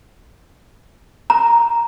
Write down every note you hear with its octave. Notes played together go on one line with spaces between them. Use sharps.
A#5